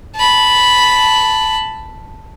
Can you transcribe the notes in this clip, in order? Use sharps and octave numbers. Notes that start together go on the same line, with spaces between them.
A5 B5